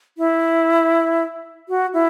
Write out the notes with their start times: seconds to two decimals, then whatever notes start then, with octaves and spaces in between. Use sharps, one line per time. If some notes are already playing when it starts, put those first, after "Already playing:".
0.18 E4
1.69 F#4
1.93 E4